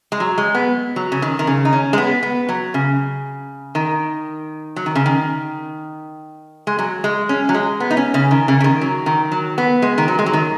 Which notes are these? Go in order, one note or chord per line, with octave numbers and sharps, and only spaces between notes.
G#3
F#3
G#3
B3
F#3
C#3
D#3
D#3
C#3
D#4
C#4
G#3
B3
B3
F#3
C#3
D#3
F#3
D#3
C#3
D#3
G#3
F#3
G#3
C#4
F#3
G#3
B3
D#4
C#4
C#3
D#3
C#3
C#3
D#3
F#3
D#3
F#3
B3
G#3
D#3
F#3
G#3
F#3
D#3